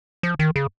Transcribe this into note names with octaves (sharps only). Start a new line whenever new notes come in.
F3
D#3
C#3